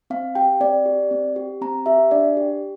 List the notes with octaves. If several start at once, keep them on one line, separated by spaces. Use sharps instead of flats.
C4 F5
G4 G5
C4 D5
G4
C4
G4
C4 A#5
G4 E5
D4 D5
G4